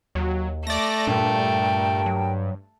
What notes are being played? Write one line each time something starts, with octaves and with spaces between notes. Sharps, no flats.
D#2 F#3
A3 D5 A#6
G2 A#2 A#4 G5 A5
F#3